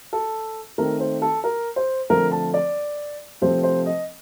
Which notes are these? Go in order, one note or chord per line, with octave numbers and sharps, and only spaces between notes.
A4
D#3 A3 C4 A#4
C5
A4
A#4
C5
D3 F3 A3 C4 A#4
A5
D5
C3 F3 A3 C4 C5
C5
D#5